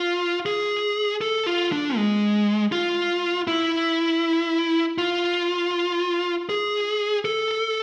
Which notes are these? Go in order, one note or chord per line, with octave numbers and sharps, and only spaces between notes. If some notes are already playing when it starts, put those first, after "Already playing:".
Already playing: F4
G#4
A4
F4
D4
G#3
F4
E4
F4
G#4
A4